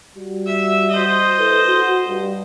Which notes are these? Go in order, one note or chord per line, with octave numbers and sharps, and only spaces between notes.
G3 F#4
E5
C5 D#5
E4 A4 B4
F#4
G2